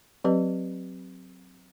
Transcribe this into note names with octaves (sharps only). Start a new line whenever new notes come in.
F#3 C4 G4 B4 D#5